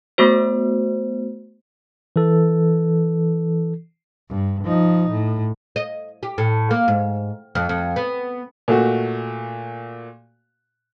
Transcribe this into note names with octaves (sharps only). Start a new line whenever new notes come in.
A3 B3 F#4 C5
E3 A4
G2
F3 D#4
A2
D#5
G4
A2
A#3
G#2
F2
F2
B3
A#2 A3 F#4